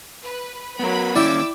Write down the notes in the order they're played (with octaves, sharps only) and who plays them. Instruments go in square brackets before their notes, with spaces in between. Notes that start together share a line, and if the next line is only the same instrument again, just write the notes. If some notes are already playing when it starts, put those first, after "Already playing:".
[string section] B4
[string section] F#3 B5 [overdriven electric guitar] B3 A#4
[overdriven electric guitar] D#2 C#4 [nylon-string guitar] E4 [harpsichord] D5 E5 G5 [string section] D6 E6